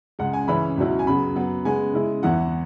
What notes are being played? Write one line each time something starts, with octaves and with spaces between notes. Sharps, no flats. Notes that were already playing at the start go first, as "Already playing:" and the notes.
C#2 C#3 G#3 F#5
G#5
C#3 E3 C#4 E4 B5
C#2 B2 F#3 C#4 E4
G#5
F#2 C#3 F#3 B3 B5
F#2 F#3 B3
C#3 G#3 B3 G#5
C#3 G#3 E4
E2 E3 B3 E4 F#5